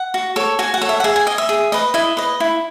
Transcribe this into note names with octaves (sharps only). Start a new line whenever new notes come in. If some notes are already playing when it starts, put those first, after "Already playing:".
Already playing: F#5
F#4
A4 C#5
F#4 G#5
F#5
A4 C#5
E5
F#5
G#4 E5
G#5
D#5 G#5
E5
G#4
B4 D#5
E4 D#5
B4 D#5
E4